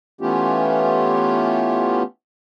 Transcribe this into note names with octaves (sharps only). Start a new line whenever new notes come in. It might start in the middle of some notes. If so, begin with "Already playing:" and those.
E3 A3 B3 C#4 F4 G4